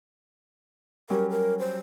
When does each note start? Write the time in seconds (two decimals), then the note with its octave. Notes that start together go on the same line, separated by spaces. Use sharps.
1.10 F#3 G3 C#4 A#4
1.30 A#4
1.59 C5